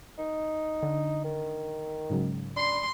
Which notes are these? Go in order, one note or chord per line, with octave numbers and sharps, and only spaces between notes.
D#4
D3
D#3
G#2 C#3 F#3
D4 B5 C6 C7